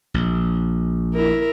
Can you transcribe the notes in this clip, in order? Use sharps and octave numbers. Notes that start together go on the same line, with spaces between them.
A#1
E4 A#4